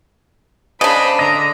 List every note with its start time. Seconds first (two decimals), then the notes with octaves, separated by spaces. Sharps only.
0.81 C#3 D4 C5 D#5 B5
1.19 D3 D#5 A#5